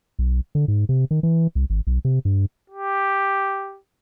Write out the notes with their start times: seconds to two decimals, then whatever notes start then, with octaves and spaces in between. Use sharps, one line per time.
0.19 B1
0.55 D3
0.68 G#2
0.89 C3
1.11 D#3
1.23 E3
1.55 C2
1.70 G#1
1.87 B1
2.05 C3
2.25 G2
2.70 G4